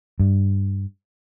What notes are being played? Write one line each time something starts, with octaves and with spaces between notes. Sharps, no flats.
G2